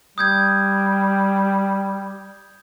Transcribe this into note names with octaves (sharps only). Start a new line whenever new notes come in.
G3 D#6 G6 G#6